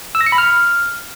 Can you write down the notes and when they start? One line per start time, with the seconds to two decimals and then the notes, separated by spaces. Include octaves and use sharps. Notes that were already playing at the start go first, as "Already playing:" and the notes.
0.15 E6
0.21 A#6
0.26 C#7
0.32 B5
0.38 F6